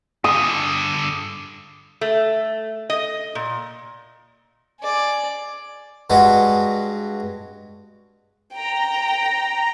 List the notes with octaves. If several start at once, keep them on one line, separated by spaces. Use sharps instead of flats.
G2 D3 D#6
A3
D#5
A#2
G#4 D5
G2 G#3 F#4
G5 A#5